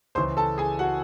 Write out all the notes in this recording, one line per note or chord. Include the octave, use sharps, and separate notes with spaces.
C#2 C#3 E3 C5 C6
A4 A5
G#4 G#5
F#4 F#5